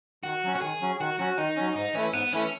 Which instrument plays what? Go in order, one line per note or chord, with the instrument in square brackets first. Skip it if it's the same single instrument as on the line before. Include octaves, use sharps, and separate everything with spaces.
[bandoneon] D#3 [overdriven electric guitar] F#4
[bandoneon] F#3 C#4
[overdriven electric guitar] F#4
[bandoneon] D#3 [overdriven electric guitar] G#4
[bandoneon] F#3 C#4
[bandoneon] D#3 [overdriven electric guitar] F#4
[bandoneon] F#3 C#4 [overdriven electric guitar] F#4
[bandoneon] D#3 [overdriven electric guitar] D#4
[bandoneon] F#3 C#4
[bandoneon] G#2 [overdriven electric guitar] D#4
[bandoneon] E3 A3 E4 [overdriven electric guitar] C#4
[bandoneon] G#2 [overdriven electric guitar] B3
[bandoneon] E3 A3 E4 [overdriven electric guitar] C#4